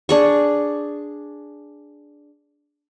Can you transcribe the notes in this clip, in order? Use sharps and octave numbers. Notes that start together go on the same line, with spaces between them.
D4 G#4 C#6